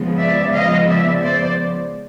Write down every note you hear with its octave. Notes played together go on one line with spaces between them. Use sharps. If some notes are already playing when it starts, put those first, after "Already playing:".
Already playing: C#3 F3 G#3 B3
D5 E5
D#5 F5
D5 E5
C5 D5